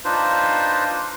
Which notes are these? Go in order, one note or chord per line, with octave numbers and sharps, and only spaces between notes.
D4 D#4 F4 B4 C5